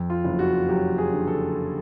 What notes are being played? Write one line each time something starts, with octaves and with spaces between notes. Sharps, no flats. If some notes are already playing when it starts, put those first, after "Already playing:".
Already playing: F2
F4
F#1
F#4
F#3 G4
G#4
D3
A4